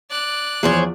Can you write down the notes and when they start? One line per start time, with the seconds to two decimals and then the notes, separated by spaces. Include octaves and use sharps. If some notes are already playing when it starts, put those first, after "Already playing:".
0.10 D5 F#6
0.63 E2 F3 G#4 C5 C#5